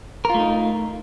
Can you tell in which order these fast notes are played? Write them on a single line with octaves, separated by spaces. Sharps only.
A#4 F4 A3 D#4